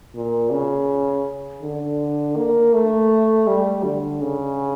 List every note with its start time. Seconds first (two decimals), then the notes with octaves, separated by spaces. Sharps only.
0.15 A#2
0.52 C#3
1.62 D3
2.37 A#3
2.74 A3
3.47 G3
3.84 D3
4.22 C#3